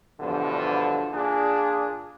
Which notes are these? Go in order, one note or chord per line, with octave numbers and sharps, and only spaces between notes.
E2 G2 B2 D3 F3
A#2 D4 G#4